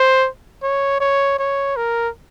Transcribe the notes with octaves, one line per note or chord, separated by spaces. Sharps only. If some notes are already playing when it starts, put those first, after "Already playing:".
Already playing: C5
C#5
C#5
C#5
A#4